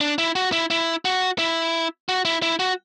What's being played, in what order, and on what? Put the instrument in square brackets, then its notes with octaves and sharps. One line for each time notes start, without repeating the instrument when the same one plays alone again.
[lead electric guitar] D4
E4
F#4
E4
E4
F#4
E4
F#4
E4
E4
F#4